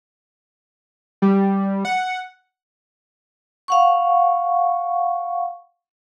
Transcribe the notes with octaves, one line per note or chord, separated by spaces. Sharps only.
G3
F#5
F5 F#5 C#6